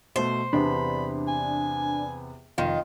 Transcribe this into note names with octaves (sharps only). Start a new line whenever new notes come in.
B2 A3 C5
E2 C3 B3 D4 B5
G#5
F1 D#3 F4